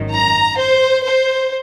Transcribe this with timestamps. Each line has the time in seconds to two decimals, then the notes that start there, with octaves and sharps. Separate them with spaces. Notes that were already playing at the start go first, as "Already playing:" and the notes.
Already playing: G#1 F#2 D#3
0.13 A#5
0.58 C5
1.05 C5